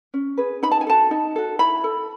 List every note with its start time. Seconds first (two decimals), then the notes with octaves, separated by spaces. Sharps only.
0.14 C#4
0.37 G#4 B4
0.63 D#4 B5
0.71 A5
0.81 G#5
0.87 F#4 A4 A5
1.11 D#4
1.36 F#4 A4
1.59 E4 B5
1.84 A4